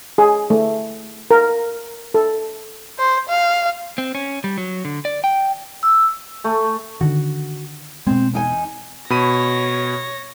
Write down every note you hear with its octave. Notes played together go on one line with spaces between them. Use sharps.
G#4
A3
A#4
A4
C5
F5
C4
C#4
G3
F#3
D3
D5
G5
E6
A3
D3 D#3 F#4
B2 G#3 C4
E2 D#4 G#5
B2 C#5 B5 A#6 D#7